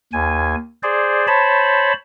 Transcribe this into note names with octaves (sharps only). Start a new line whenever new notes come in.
D#2 G#5
G#4 C5 D5
C5 C#5 A5 B5